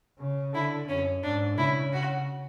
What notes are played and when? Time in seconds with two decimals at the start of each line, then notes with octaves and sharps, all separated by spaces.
0.19 C#3
0.53 D3 E4
0.89 F#2 C#4
1.23 G#2 D4
1.58 C#3 E4
1.93 F#4